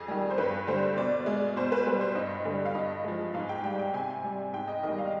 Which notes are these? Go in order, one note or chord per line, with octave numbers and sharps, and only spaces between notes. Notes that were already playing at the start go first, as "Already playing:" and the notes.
Already playing: F2 G#4
D#3 G3
C5
G2 B4
D3 G3 C5
B2 D5
G#3
B2 C5
B4
G3 B4
C5
G2 D#5
D3 G3
F5
G2 D#5
F3 G#3
G#2 F5
G5
G3 G5
G5
C3 G#5
G3
G#2 G5
D#5
D#3 G3 D#5
F5